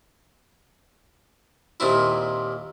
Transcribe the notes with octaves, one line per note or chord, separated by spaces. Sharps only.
D#2 A#2 C4 E4